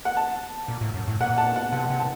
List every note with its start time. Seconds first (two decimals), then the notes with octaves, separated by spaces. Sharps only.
0.05 F#5
0.17 A5
0.68 A#2
0.81 A2
0.94 F#2
1.08 A2
1.20 A#2 F#5
1.38 A5
1.56 F#5
1.72 C3 F#5
1.90 C3
2.00 A5